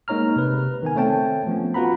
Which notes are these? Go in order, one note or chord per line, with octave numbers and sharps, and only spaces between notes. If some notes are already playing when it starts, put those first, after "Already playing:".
G#3 A#3 D#4 C#5 A#5 F6
C3 B4
D#3 B3 G#5
A3 C4 C#5 G5 A5
F3 B3 C#4
F4 F#4 B4 F#5 A#5 B5